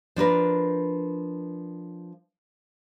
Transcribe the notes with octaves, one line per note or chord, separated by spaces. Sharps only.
F3 D4 A#4 B4